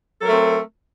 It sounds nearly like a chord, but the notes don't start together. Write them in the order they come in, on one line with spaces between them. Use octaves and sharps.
A4 F#3 A#4 A3 C4